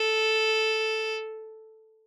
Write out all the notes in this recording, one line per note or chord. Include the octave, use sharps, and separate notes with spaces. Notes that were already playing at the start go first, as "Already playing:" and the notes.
Already playing: A4